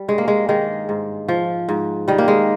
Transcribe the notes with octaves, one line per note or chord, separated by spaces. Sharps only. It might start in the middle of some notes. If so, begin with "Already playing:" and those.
Already playing: G3
G2 G#3
A#3
G#3
D#3 G#3
G#2
F3
G#2
D#3 G3
A#3
G#3